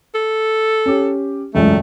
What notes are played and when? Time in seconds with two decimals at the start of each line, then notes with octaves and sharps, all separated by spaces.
0.15 A4
0.86 C#4 G4
1.55 E1 C#2 F#2 A3